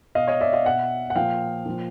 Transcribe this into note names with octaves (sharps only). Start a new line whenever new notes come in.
B2 D#5 F5
C#5 D#5
D5 E5
D#5 F5
B2 E5 F#5
F#5
A#2 F3 F5 G5
A#2 F3